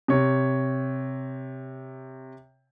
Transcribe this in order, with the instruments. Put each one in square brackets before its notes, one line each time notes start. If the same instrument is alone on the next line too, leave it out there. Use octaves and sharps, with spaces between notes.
[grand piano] C3 C#5